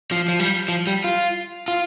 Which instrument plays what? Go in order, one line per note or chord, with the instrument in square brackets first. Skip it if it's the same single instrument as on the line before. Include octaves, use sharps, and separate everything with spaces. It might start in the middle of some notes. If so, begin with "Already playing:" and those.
[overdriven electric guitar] F3
F3
G3
F3
G3
F4
F4